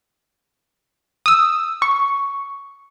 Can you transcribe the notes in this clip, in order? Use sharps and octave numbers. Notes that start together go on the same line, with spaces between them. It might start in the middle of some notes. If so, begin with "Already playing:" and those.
D#6 E6
C#6